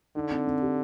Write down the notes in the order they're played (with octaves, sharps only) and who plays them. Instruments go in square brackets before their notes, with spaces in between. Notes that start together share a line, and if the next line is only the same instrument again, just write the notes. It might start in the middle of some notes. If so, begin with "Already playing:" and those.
[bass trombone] D3 [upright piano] D#4
[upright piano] C4
C4
G4